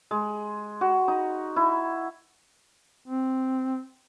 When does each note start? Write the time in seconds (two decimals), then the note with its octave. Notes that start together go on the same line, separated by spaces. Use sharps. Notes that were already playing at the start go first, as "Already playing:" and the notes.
0.11 G#3
0.81 F#4
1.08 D#4
1.56 E4
3.06 C4